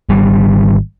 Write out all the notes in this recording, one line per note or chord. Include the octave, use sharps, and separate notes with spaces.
G#1 G3